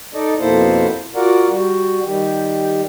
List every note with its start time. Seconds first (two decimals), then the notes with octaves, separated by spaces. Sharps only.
0.14 D#4 A4 D5 D#5
0.39 F2 B2 A#3 E4 A4 C5
1.15 F4 F#4 A#4 D5 F#5
1.48 G3 F#4
2.04 D#3 G3 G4